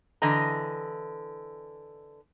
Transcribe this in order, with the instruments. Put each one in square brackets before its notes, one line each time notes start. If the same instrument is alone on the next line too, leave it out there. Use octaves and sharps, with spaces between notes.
[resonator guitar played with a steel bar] D3 E3 D#5 A#5